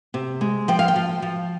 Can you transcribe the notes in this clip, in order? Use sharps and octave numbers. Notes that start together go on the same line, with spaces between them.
C3
G#3
F3 G5
F5
G5
F3
F3